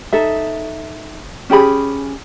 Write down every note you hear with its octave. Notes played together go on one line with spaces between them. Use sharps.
D#4 A4 E5
C#4 G4 G#4 B5